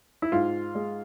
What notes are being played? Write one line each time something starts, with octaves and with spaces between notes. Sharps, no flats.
E4
G#2 F4
G#3